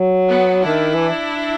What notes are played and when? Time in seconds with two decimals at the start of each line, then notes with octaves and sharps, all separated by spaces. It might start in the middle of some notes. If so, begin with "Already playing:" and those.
Already playing: F#3
0.30 B3
0.64 D#3 D4 E4
0.94 E3